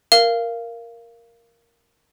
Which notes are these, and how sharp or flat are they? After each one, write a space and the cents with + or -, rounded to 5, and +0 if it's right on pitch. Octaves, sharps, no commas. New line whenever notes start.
A#4 +0 F5 -15